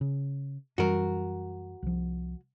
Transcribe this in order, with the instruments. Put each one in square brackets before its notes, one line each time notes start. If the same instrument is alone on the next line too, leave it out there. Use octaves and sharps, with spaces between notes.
[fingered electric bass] C#3
[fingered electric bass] F#2 E3 G3 [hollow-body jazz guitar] F#4 A#4
[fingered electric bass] C2 F3